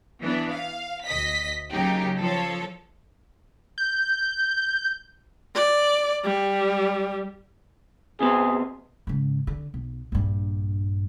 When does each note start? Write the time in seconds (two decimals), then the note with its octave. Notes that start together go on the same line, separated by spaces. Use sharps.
0.23 E3 B3 D4
0.53 F5
1.06 D2 D#5 B6
1.73 C#3 F#3 A#3 D#4 G4
2.22 F3 A4 C#5
3.78 G6
5.55 D5
6.24 G3
8.20 C3 B3 G#4 C5
9.07 G#2 C#3
9.47 D3
9.74 B1
10.12 A#1 G2